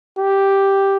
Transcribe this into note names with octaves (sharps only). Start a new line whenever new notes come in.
G4